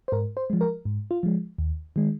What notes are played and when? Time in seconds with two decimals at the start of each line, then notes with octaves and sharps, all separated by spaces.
0.08 C5
0.12 G#2 A#4
0.37 C5
0.50 F3 G#3
0.61 A#4
0.85 G#2
1.11 F4
1.23 F3 G#3
1.58 D#2
1.96 D#3 G#3